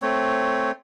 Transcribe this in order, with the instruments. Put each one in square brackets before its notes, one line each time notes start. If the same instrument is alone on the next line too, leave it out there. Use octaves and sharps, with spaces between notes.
[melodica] A3 C4 C#5